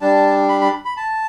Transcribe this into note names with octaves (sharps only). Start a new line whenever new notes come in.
G3 D4 A5
B5
B5
B5
A5